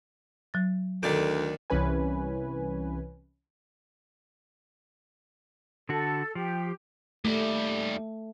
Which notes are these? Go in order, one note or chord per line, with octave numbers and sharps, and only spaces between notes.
F#3 A6
D2 D#3 A4 D5 D6
C2 E3 C#4 B4 G#5
D3 F#4 A4
F3 G4
D#2 G3 A3